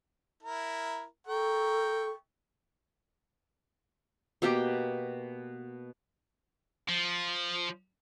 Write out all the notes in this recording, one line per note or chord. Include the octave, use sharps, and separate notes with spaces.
E4 A#4
A4 A#4 G5 C#6
B2 A#3 G4 G5
F3